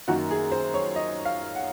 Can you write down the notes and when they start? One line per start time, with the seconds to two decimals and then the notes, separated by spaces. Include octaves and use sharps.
0.08 F#2 D#3 A#3 F#4
0.31 G#4
0.52 C5
0.74 C#5
0.96 D#5
1.25 F5
1.55 F#5